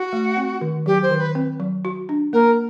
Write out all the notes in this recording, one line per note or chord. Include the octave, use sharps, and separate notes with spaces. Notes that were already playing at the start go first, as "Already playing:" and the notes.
Already playing: F#4
A3
C4
D#3
F#3 G4
C5
D#3
B4
C4
F#3
F#4
D4
A#3 A#4